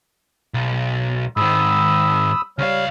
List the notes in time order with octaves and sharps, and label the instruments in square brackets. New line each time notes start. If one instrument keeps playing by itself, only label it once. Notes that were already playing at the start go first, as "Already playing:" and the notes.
[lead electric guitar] B1
[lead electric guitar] G#2 D#3 [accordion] B5 D#6 E6
[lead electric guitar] C#2 F5 [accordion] G3 C#5 F6